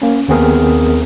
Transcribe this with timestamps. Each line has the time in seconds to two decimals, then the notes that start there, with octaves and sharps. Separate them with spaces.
0.02 A#3 C#4
0.28 D#2 B3 C4 G#4 A#4